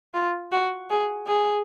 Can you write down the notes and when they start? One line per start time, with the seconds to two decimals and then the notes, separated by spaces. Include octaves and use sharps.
0.14 F4
0.52 F#4
0.90 G#4
1.27 G#4